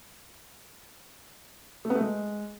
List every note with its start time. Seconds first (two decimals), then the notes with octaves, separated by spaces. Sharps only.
1.85 A3
1.90 B3
1.95 A3
2.01 G#3